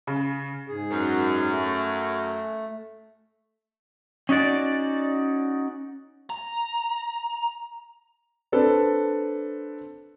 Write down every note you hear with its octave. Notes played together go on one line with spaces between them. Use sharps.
C#3
G#2 G#4
F#2
A3
C#4 D#4 F#4 D5
A#5
C4 D4 A4 B4 D5